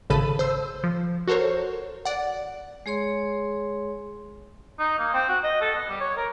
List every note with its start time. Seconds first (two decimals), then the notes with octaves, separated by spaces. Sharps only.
0.10 G#1 C#3 A4 A5 B5 D#7
0.39 C5 E6
0.84 F3
1.28 F#4 A4 A#4 C5 C#5
2.05 D5 F#5
2.86 G#3 G#4 C#5 C6
4.79 D#4
4.99 A#3
5.14 C4
5.29 F#4
5.44 D#5
5.61 A4
5.75 B3
5.89 G3
6.01 C#5
6.17 A#4